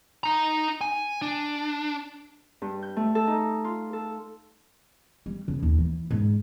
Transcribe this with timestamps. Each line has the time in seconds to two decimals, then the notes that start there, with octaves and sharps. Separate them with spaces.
0.24 D#4 A#5
0.81 G#5
1.22 D4
2.62 G2
2.82 G6
2.96 A3
3.15 A4
3.27 D#4
3.65 F4
3.93 A4
5.26 G3
5.48 C#3
5.63 D#2
5.78 E3
6.11 G#2